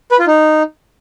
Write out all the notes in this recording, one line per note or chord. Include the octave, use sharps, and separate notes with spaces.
B4
F4
D#4